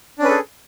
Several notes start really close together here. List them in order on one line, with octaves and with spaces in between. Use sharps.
D4 C#4 B4 A4 G#4